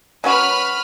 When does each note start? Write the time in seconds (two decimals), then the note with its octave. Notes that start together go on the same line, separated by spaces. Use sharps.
0.24 F#3 C#4 F#4 B4 B5 F6